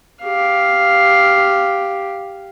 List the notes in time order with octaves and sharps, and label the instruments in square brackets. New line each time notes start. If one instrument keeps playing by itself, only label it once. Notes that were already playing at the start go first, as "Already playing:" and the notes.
[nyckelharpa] G4 F5